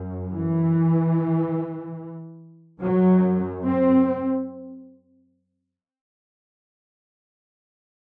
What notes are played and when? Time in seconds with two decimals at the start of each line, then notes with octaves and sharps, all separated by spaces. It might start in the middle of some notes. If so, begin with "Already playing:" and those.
Already playing: F#2
0.32 E3
2.81 F#2 F#3
3.65 C4